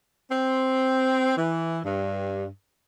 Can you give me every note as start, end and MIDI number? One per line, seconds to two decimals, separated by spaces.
0.30 1.33 60
1.37 1.80 52
1.84 2.46 43